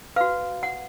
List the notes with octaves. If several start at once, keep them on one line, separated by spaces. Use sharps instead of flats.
F#4 B4 F5
F#5